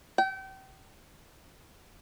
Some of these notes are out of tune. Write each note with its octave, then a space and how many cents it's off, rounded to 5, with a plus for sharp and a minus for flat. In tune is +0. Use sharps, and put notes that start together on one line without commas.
G5 -35